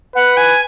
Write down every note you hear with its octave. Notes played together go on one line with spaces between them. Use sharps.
B4 F#5
G#5